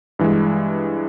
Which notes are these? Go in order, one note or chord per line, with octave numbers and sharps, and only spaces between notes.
G2 E3 G#3